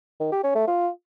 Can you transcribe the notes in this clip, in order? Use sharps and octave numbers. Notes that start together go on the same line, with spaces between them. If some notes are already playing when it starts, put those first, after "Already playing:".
D#3
G4
C#4
A3
F4